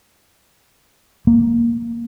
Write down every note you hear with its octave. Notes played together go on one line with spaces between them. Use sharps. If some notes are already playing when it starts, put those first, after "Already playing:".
A#3